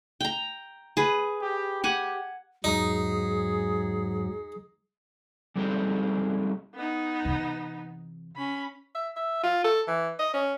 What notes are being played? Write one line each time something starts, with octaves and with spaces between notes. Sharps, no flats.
G5 A#5
G#4 B4
G4
G4 F#5 G#5
E2 G#2 F#3 D#4 G#4 A#5 D#6
G3 G#3 C4 D#4 G4 A4
B3 D#4
C3 E3
C#4 B5
E5
E5
F4
A4
E3
D#5
C#4